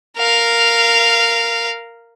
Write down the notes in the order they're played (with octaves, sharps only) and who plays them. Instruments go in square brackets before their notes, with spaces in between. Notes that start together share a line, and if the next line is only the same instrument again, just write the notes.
[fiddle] A#4 F5